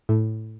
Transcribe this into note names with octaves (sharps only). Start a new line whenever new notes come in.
A2